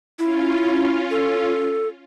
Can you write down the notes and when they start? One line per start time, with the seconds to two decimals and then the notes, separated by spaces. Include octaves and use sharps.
0.19 C#4 E4 F4
1.11 A4